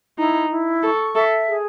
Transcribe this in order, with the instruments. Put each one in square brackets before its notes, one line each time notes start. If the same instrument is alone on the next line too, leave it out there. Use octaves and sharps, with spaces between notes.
[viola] D#4 [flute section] E4
[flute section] E4
[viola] A4 [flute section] C#6
[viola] A4 [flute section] E5
[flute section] G#4